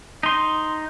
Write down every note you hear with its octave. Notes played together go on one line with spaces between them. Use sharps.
D#4 C6